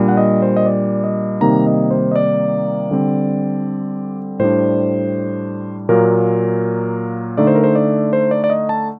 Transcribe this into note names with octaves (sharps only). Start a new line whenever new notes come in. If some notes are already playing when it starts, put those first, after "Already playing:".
Already playing: A#2 G3 D4
F#5
D#5
C5
D#5
D5
D#5
C3 D#3 G3 A#3 D#4 A#5
D#5
C5
D#5
D5
D3 G3 C4
A2 G3 D4 C5
A#2 F#3 A#3 A#4
D3 A3 D#4 D5
C5
A#4
C5
D5
C5
D5
D5
D#5
A5